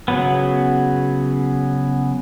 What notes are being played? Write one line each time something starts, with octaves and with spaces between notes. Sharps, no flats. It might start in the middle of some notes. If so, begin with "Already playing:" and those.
C#3 F#3 B3